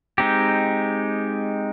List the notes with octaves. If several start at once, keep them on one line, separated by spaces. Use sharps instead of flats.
G#3 C4 D#4 G4